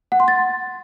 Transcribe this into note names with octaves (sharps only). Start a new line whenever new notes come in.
F#5
C6
A6